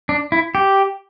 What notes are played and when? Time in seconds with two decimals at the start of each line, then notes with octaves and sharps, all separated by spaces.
0.09 D4
0.32 E4
0.55 G4